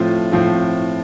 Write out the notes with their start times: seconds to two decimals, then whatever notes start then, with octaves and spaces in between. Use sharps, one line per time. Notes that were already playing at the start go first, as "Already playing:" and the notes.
Already playing: A2 F3 A3 C4 F4
0.32 A2 F3 A3 C4